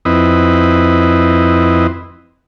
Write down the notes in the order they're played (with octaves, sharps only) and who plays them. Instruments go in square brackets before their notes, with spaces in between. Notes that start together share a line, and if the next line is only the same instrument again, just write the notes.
[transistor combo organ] F2 C4 E4 B4 D#5